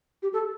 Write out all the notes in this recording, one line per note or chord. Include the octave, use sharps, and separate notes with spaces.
G4
A4